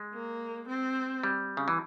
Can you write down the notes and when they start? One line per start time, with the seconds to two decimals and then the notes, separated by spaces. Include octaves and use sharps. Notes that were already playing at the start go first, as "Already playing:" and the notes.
Already playing: G#3
0.13 A#3
0.69 C4
1.23 G3
1.57 C#3
1.68 E3